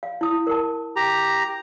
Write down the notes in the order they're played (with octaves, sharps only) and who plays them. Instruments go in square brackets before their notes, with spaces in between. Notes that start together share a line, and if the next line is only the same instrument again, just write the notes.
[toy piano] F5
E4 D#6
A#4 A5
[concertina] G4 A#5